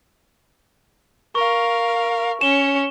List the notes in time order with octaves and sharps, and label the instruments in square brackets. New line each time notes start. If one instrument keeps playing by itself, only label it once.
[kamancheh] A#4 F5 [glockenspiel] C#6
[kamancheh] C#4 C#5 [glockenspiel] E7 G7